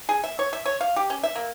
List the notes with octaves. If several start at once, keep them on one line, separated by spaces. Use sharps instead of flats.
G#4
E5
C#5
E5
C#5
F5
G4
C#4
E5
A#3